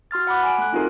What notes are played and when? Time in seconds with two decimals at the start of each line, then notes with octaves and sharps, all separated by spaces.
0.11 F#4 C6 F6 A6
0.27 F#5 B5 D6 F#6
0.43 G#5 D7
0.58 A3 F#6
0.72 C4 D#4 F4 F#4 G#4 A#4